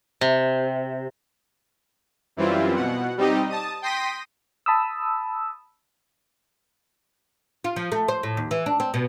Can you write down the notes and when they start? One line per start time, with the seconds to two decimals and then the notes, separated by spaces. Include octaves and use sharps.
0.21 C3
2.37 F#2 E3 G3 C4 E4 F4
2.76 B2 F#5
3.18 G3 C4 D#4 G4 D#5
3.50 A5 D#6
3.82 G5 C6 D#6 A#6 B6 D#7
4.66 A5 B5 D#6 E6
7.64 F4
7.76 F3
7.92 A3
8.08 C5
8.23 A2
8.37 D#2
8.51 E3
8.66 D4
8.80 C4
8.94 B2